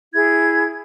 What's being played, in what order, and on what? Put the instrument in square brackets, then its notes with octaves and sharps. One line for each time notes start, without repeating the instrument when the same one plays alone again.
[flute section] E4 G#4 G#6